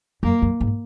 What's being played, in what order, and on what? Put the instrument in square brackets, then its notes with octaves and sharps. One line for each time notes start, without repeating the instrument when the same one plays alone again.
[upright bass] F#2 [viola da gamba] A#3
[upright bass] F#2
G#2